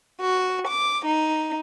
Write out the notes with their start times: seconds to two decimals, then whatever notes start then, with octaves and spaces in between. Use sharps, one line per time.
0.20 F#4
0.66 D6
1.06 D#4